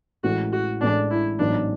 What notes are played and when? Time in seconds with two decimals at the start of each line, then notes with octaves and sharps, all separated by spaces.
0.23 A1 A2 E3 G#3 F#4
0.53 F#4
0.81 A1 A2 E3 G#3 D4
1.11 E4
1.39 A1 G#2 F#3 B3 D4